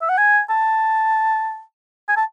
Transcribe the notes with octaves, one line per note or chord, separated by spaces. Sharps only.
E5
F#5
G#5
A5
G#5
A5